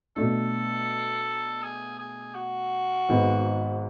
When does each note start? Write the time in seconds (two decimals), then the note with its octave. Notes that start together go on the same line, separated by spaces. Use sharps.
0.16 B2 A3 D4 A4
1.62 G#4
1.99 G#4
2.35 F#4
3.09 G#1 G#2 G#3 B3